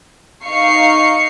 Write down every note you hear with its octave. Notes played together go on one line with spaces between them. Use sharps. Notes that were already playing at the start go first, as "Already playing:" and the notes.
D#4 F5 C#6 C7 C#7